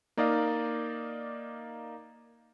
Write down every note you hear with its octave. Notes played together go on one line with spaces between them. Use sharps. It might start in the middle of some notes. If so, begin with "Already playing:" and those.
A#3 D#4 D5 D#5 F5